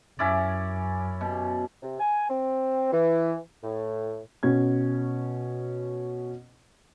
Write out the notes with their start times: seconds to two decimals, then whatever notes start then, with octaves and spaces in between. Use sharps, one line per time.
0.19 F#2 C#4 E4 D5
1.21 B2
1.82 C3
2.00 G#5
2.29 C4
2.92 E3
3.64 A2
4.43 B2 C#4 G#6